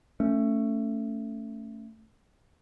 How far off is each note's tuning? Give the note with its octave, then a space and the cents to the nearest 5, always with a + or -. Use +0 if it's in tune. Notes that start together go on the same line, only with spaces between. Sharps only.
A3 +15 C#4 +0